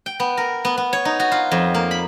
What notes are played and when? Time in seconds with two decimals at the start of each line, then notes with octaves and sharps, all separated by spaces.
0.06 G5
0.20 B3
0.37 A#4
0.65 B3
0.78 B3
0.93 C#5
1.05 D#4
1.20 F#4
1.32 F4
1.52 F2
1.75 A#3
1.91 B5